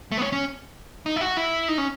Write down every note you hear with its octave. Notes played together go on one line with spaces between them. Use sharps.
A3
B3
C#4
C#4
D#4
E4
F#4
E4
D#4
C#4